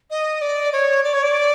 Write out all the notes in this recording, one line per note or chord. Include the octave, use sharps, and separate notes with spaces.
D#5
D5
C#5
D5
C#5
D5